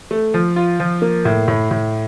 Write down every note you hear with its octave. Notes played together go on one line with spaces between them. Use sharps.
A3
F3
F4
F3
A#3
A2
A2
A2